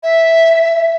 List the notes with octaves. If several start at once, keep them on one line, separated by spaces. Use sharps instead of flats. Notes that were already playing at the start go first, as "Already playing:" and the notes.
E5